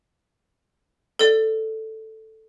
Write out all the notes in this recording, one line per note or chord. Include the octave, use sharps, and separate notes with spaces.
A4 D5